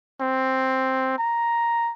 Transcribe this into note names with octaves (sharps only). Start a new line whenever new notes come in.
C4
A#5